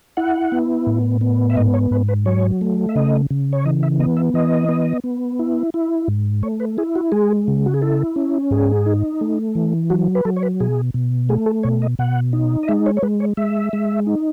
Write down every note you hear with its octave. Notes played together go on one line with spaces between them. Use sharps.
E4 F#5
B3
A2
B3
E5
G#2 D#5
C#5
G#2 B4
B4
F#3 C#5
A3
E5
C#3 D#5
C#3
C#5
E3 D#5
E5
B3 D#5
E5
E3 D#5
B3
B3
E4
E4
G#2
A3 C#5
B4
E4 G#4
F#4
G#3 G#4
C#3
F#4
G#4
E4 A4
C#4
G#2 G#4
D#4
A3
E3
F#3 F#4
B4
F#3 A4
C#5
B4
B2 G#4
B2
A3 G#4
A4
B2 C#5
D#5
B2 F#5
D#4
D#5
G#3 E5
C#5
C#5
G#3 B4
C#5
G#3 E5
G#3
D#4